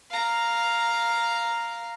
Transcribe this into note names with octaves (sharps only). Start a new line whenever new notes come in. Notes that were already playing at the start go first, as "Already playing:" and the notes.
F5 A#5